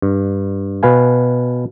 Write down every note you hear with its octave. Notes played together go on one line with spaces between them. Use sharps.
G2
B2 B4 F5 G#5